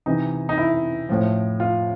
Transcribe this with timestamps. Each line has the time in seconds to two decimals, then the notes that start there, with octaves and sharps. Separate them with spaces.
0.06 C3 E3 D#4
0.49 D#4
0.58 E4
1.09 A2 F3
1.60 F4